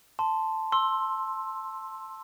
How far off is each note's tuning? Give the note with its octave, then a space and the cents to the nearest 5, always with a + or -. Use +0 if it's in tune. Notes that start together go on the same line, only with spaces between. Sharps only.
A5 +0 C6 +0
C6 +15 E6 +0